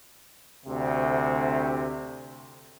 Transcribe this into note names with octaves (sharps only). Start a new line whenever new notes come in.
D2 C3